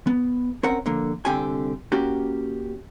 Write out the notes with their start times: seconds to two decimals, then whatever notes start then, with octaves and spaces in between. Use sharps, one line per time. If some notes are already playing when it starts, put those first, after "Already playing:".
0.07 B3
0.63 C4 C#4 A#4 C#5 F#5
0.86 D3 F3 A#3
1.25 C2 D3 C4 G4 G5 G#5
1.92 A#3 C#4 F#4 G4